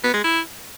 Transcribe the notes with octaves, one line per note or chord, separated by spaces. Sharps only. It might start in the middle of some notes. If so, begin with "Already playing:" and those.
B3
G#3
E4